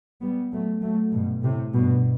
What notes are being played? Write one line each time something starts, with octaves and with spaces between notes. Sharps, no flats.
G3 B3
F#3 A3
F#3 A3
G2 B2
A2 C3
G2 B2